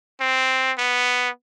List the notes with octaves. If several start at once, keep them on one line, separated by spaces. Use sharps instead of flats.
C4
B3